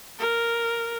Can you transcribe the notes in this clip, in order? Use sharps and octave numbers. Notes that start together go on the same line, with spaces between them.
A#4